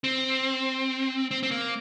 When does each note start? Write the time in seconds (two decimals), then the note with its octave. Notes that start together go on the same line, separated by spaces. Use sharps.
0.04 C4
1.31 C4
1.43 C4
1.51 A#3